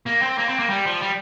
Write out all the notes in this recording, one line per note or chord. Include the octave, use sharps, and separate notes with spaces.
A#3
C4
A#3
C4
A#3
G3
F3
G3